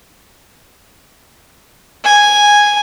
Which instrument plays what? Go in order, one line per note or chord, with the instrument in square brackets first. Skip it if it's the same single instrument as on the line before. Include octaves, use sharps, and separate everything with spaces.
[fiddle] G#5